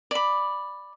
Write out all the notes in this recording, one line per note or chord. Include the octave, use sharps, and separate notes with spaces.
D5 B5